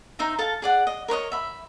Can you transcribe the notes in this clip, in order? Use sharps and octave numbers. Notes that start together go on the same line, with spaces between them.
D#4 C5 E5 A#5
A4 F5 A5
G#4 D5 F#5
D#5
A#4 B4 C#5 D#5
E5 B5